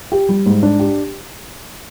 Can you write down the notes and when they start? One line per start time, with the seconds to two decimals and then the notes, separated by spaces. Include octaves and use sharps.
0.12 G4
0.29 G3
0.46 G#2
0.63 D4
0.79 G4